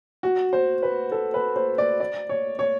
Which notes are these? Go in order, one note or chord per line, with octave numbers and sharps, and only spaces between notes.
F#4
C5
B4
A4
B4
C5
D5
D5
C#5
C#5